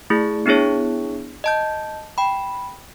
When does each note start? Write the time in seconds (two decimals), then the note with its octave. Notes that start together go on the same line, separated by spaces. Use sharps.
0.10 A3 E4 G#4
0.46 B3 D4 E4 G#4 C#5
1.44 D#5 A5 G6
2.18 G5 B5